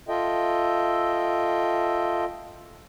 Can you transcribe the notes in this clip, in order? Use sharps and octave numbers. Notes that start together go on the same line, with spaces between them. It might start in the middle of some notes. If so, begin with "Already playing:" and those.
F4 A4 D#5 E5 G5